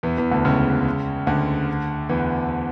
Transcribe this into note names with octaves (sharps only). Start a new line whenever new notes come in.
E2 E3
E2 E3
D2 D3
C#2 C#3
D2 D3
E2 E3